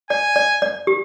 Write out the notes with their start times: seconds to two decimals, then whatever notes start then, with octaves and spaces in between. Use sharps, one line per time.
0.10 D5 G#5
0.36 D5
0.62 D5
0.87 G4